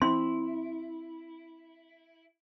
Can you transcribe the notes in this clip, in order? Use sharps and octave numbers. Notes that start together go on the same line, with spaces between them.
C4 E4 C6